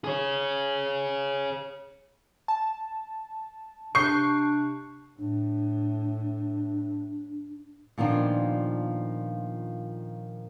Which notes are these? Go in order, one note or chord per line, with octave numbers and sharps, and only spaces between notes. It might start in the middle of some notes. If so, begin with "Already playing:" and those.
G#4 C#5
A5
C3 D4 C#6 G6 C7
A2 D4
A#2 D#3 F3 B3 D4